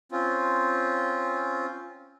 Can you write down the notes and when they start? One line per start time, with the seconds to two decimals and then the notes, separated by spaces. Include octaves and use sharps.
0.12 C4 C#4 F4